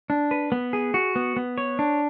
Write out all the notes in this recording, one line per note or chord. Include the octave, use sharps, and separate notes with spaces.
D4
B4
B3
G#4
F#4
B3
B3
C#5
D4